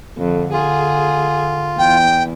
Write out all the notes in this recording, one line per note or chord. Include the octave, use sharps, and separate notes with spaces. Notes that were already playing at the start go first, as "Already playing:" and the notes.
F2 D3
F4 G#4
E2 G5